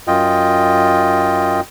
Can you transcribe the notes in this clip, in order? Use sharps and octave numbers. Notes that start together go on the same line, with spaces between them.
F#2 F4 D#5 G5